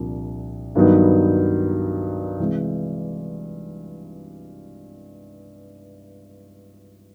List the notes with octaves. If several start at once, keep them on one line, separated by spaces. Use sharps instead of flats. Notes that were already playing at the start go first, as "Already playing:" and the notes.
Already playing: C2 A#2 F3 D4
G2 D#3 F#3 B3 D#4
C3 E3 G#3